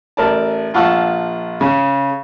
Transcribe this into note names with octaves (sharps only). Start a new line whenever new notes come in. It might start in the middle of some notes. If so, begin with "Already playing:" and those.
A1 A#4 D5 A5
A#1 F4 F#5 A5 C#6 E6
C#3